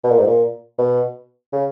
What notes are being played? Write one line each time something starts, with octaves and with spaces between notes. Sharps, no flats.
B2
A#2
G#2
A#2
B2
C#3